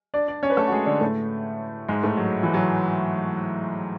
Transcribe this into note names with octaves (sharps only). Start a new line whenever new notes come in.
D4 D5
D4 D5
C#4 C#5
B4
A3 A4
F#4
G#3 G#4
D3 D4
A2 A3
G#2 G#3
A2 A3
F#3
E3
F#3